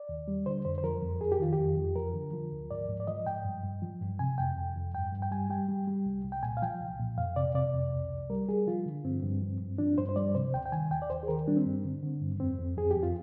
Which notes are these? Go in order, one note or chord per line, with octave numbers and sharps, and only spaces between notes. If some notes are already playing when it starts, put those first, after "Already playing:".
Already playing: D5
D#2
G3
D3 C5
F2 C5
C5
F3 A#4
F2
F2 G#4
G4
D#3 F4
G4
F2
F2
F3 A#4
D3
F3
D2
G#2 D5
G#2
D5
F3 D#5
G#2 G5
G2
G2
F3
G2
C3 G#5
F2 G5
F2
F2
G2 G5
G2
G5
G3 G#5
G3 G5
G3
G3
C2
C2
G5
A#2 G#5
F5
F3 G5
C2
A#2
F2 F5
C3 D5
C3 D5
F2
C2
C2
G3 A#4
G3 G#4
F3 F4
D3
G2 C4
G2
F3
G2
F3 D4
G2 C5
C5
G3 D5
C3 C5
D2 G5
G5
D#3 G#5
D#2 G5
D5
D#2 C5
G#4
D#3 A#4
G3 D4
C4
G2
D3
D3
G2
F2 C4
F2
F2 G#4
G4
F2
F4